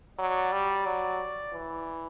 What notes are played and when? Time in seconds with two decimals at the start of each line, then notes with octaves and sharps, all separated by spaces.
0.18 F#3 D5
0.52 G3
0.86 F#3
1.53 E3